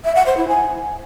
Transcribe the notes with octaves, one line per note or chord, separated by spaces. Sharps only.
E5
F#5
C5
E4
G#5